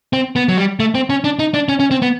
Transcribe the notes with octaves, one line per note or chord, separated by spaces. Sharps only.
C4
B3
F#3
G3
A3
C4
C#4
D4
D#4
D4
C#4
C#4
C4
B3